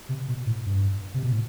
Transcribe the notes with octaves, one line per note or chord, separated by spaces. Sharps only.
C3
B2
A2
G2
C3
B2
A2